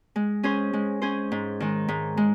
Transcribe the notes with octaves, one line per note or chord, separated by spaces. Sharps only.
G#3
C#4 G#4 C5
G#3
C#4 G#4 C5
G#2
D#3 G#3
G#2
G#3